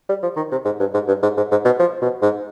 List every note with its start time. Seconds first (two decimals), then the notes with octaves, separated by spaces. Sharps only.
0.09 G3
0.22 F3
0.36 D#3
0.51 C3
0.65 G#2
0.80 G2
0.94 G#2
1.08 G2
1.23 G#2
1.37 G#2
1.51 G#2
1.65 B2
1.79 F3
2.02 B2
2.22 G#2